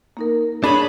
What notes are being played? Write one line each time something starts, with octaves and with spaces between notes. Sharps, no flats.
A#3 D#4 A#4
D4 G#4 C#5 B5